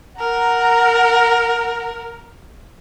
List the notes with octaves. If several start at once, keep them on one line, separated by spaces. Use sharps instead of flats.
A#4 F#5 A#5